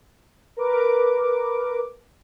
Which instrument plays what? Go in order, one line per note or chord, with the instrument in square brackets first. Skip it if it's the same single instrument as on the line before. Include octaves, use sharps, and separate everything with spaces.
[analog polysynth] A#4 B4 D6